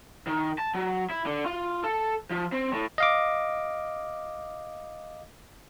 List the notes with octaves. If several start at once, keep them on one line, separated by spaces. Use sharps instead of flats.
D#3
A5
F#3
E4
D3
F4
A4
F3
C4
A2
D#5 F5 D6